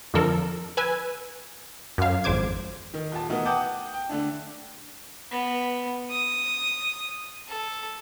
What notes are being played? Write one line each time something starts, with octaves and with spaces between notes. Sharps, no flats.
F2 D3 F3 A4 A#4
B4 G#5 E6
F#2 F5
G#1 F2 C5 D6 G#6
D#3
D#1 A5
B2 E3 A3 D#4 F#4 A#4
F#5 G5 A5 D6 D#6 G6
G5
D3 A3 D4
B3
D#6
A4